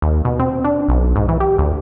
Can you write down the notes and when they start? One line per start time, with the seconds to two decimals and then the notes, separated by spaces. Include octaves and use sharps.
0.02 D#2
0.25 B2
0.40 C4
0.64 D4
0.88 B1
1.16 G#2
1.28 E3
1.40 G4
1.58 D2